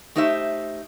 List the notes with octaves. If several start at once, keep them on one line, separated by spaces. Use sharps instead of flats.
A3 D#4 G4 C5 E5